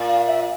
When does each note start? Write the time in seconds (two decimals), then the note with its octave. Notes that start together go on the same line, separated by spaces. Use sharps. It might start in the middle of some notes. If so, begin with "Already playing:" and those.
Already playing: A#2
0.08 F5
0.27 E5